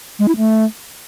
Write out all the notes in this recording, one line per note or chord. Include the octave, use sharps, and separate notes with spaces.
G#3
E4
A3